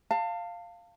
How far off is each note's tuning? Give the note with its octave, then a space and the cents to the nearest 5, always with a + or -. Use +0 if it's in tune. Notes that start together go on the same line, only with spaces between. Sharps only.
F5 +0 A5 +30